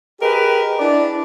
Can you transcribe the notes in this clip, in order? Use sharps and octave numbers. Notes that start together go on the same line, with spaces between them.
G4 G#4 A#4 B4 D#5
D4 E4 D5